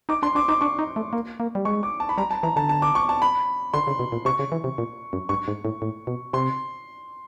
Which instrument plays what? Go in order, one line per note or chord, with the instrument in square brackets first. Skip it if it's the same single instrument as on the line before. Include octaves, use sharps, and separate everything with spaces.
[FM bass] D#4 [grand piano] D6
[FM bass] D4 [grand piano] C6
[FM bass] D4 [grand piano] D6
[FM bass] D#4 [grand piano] D6
[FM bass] D4 [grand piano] C#6
[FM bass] D#4
A3
A#3
A#3
G3
[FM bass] G#3 [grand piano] C#6
[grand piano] D6
A5
B5
[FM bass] G3 [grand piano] A#5
[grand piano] A5
[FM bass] E3 [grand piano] A#5
[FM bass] D3 [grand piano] A5
[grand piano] A5
D6
C#6
A5
B5
[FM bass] D3 [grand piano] C6
[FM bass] C#3
B2
A#2
[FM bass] C3 [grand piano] C#6
[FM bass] C#3
E3
C3
A#2
F#2
[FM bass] G2 [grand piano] C#6
[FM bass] G#2
A2
A2
B2
[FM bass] C3 [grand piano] C6